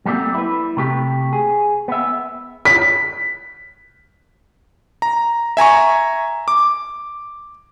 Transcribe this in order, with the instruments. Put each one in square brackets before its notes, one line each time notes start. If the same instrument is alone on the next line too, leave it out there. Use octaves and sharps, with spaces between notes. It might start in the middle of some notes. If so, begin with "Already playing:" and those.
[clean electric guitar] F#3 G3 A3 A#3 C4
E4 B4
C3 A3 G4
G#4
B3 E5
[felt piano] B6
[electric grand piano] A#5
E5 G#5 A#5 C#6
D6